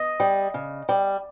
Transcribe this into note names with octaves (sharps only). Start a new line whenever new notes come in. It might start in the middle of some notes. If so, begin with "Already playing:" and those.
Already playing: D#5
G3
C#3
G3